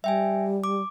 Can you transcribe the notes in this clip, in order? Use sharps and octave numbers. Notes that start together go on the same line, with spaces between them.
G3 E5 G5 G#5
D6